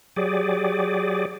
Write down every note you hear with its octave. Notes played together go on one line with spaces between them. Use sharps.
F#3 G4 G#4 D5